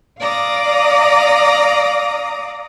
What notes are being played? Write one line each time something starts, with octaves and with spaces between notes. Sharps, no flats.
D5 F5 A#5 D6 D#6